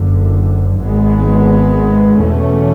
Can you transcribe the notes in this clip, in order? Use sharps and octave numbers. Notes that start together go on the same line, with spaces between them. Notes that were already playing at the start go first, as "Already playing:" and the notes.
Already playing: F#1 F#2 D3
G#1 G#2 G#3 B3
E2 B2 A3 C#4